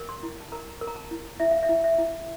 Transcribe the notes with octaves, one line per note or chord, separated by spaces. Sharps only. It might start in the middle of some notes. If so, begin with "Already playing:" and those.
Already playing: A#4
C6
E4
A5
A#4 A#5
A#4
A#5
A5
E4
E4 E5
F5
E5
E4
E5
E4